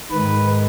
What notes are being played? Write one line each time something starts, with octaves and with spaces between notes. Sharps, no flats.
G#2 D#3 B4